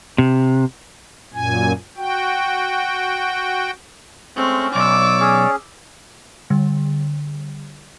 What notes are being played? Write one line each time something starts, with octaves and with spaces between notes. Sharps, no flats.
C3
F#2 A#2 G#5
F#4 G5
G#3 A3 C4 C#4 C#6
B1 C#5 D5 D6 E6
C#4 G#4
D3 G3